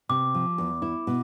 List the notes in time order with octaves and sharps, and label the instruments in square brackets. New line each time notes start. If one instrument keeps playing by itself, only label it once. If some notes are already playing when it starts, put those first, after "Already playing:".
[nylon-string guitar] C3 [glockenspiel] D6
[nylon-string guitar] F3
E2
E4
B2